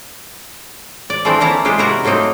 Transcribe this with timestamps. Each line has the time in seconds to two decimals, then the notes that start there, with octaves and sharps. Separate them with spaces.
1.10 D5
1.25 E3 F3 A3 C4 D4
1.40 E3 A#3 E4 A5 A#5
1.65 G#3 F4 G4 A4
1.78 C3 G3 E4 F#4 A#4 A#5
2.04 F#3 A3 A#3 C4 D#4